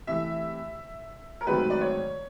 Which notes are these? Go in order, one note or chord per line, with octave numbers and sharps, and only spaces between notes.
C3 E3 A3 E5
A#4
G#2 D#3 F#3 A3 C4 B4
D5
C#5